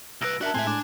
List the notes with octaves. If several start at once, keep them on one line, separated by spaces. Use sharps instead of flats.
C2 B4 E6 A#6 D7
D4 F#4 A#4 E5 A5 F#6
A2 G#3 C4 E5 G#5 C6
D4 D6